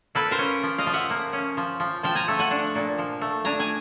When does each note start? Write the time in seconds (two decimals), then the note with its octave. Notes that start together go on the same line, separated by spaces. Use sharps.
0.15 A#3 A4 B4
0.31 A#4 C5
0.39 C#4
0.63 F3
0.78 D#5 F5
0.86 F3
0.93 E5 F#5
1.10 A#3
1.33 C#4
1.57 F3
1.80 F3
2.03 F3 G5 A5
2.15 G#5 A#5
2.28 A3
2.39 F#5 G#5
2.51 D4
2.75 A#2
2.98 F3
3.21 A3
3.45 D4 G#5 A#5
3.60 G#5